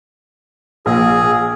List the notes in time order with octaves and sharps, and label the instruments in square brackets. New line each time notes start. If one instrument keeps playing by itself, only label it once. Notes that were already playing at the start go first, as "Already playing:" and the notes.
[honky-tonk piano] A#1 [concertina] G#4